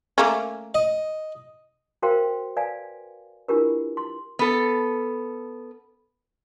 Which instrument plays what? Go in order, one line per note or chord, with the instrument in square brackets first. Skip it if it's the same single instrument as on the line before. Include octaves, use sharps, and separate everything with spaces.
[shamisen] A3 A#3 C#4
[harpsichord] D#5
[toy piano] F#4 A#4 C5 F5 G5 C6
B4 D5 F5 G#5
D4 E4 F4 G4 A#4 B4
C6
[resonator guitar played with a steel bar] B3 A4